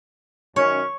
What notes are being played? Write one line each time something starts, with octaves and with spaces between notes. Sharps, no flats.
F#2 D#3 C#4 C#5